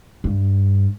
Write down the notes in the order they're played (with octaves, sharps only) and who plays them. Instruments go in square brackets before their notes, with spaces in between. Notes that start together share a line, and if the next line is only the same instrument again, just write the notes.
[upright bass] G2